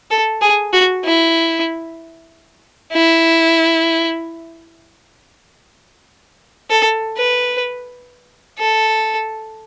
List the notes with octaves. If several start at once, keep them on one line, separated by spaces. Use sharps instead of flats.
A4
G#4
F#4
E4
E4
A4
B4
A4